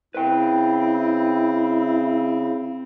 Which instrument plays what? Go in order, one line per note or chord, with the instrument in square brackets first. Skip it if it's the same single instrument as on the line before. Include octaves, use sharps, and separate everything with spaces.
[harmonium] C#3 [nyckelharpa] C4 [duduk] E4 [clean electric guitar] B4 G5